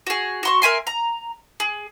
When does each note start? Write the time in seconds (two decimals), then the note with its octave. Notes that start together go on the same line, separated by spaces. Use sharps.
0.07 F#4 G#4
0.43 F#4 C6 C#6
0.62 A#4 E5 G#5 C6
0.87 A#5
1.60 G#4